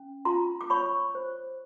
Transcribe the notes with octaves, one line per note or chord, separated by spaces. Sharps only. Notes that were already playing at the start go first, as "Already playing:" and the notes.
Already playing: C#4
F4 A#5 C6
D6
C#5 B5 C#6
C5